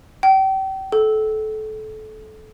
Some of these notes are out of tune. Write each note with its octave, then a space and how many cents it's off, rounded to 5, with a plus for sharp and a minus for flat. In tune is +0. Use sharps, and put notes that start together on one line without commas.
G5 -35
A4 -25